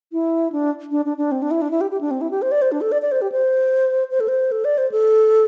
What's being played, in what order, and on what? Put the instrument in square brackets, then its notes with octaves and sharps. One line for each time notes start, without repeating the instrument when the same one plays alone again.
[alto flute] E4
D4
D4
D4
D4
C4
D4
E4
D4
E4
G4
G4
D4
C4
E4
G4
C5
D5
C5
D4
A4
D5
D5
C5
G4
C5
C5
A4
C5
A4
D5
C5
A4